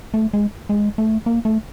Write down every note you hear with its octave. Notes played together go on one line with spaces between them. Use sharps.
A3
G#3
G#3
A3
A#3
A3